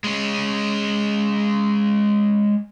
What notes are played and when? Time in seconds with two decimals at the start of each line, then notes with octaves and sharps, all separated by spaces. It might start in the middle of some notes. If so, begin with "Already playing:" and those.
0.04 G#3 C#4